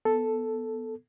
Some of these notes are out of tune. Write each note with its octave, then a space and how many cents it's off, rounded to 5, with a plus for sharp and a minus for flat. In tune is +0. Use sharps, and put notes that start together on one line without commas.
B3 +0 A4 +0